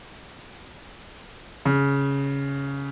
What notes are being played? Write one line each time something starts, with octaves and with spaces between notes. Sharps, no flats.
C#3